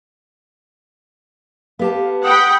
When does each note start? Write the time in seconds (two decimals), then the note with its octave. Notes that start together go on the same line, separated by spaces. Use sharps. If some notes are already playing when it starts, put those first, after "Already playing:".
1.79 B3 G4 F5 A5
2.24 F#5 G5 B5 D#6